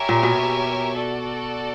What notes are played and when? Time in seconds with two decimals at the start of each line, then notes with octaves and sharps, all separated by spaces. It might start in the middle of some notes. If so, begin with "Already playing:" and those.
Already playing: G4 A#4 C#5 E5 G#5
0.09 A#2
0.23 B2
0.97 F#4 A4 D5